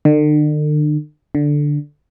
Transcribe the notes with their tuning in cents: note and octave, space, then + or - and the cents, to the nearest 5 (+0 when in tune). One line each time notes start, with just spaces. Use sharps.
D3 +45
D3 +0